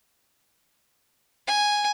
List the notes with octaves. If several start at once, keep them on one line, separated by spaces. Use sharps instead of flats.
G#5